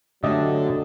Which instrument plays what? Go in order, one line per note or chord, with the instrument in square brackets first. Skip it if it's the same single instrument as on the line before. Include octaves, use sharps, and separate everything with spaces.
[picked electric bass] D3 [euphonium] F#3 [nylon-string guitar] A3 D4 [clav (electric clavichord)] G4 D#5 E5